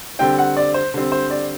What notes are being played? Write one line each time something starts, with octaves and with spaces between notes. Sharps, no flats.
D3 G3 C4 G5
F#5
D5
C5
D3 G3 C4
C5
D5